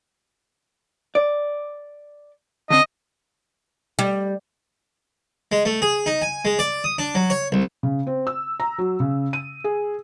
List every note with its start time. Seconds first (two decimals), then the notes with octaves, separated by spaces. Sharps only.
1.15 D5
2.70 D3 C4 D#5
3.99 G3
5.52 G#3
5.65 A3
5.82 G#4
6.06 D#4
6.22 G#5
6.45 G#3
6.59 D5
6.84 D#6
6.98 D4
7.15 F#3
7.30 C#5
7.52 C2
7.83 C#3
8.07 C4
8.27 E6
8.60 A#5
8.78 F#3
9.00 C#3
9.33 D#7
9.64 G#4